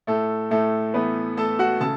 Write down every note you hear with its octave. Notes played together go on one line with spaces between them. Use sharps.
A2 A3 A4
A2 A3 A4
E3 B3 B4
A3 A4 A5
F#4 F#5
C#3 A4 A5